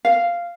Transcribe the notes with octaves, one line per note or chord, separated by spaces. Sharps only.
F5